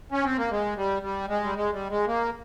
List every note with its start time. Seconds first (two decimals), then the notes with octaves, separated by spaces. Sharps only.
0.12 C#4
0.24 C4
0.37 A#3
0.51 G#3
0.77 G3
1.02 G3
1.28 G#3
1.44 G3
1.55 G#3
1.72 G3
1.90 G#3
2.07 A#3